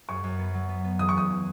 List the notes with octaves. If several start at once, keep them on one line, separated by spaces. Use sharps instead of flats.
F#2 C#6
F#2
B3
F#3
B3
B3
E3 D#6
C#6
E2 D#6
E3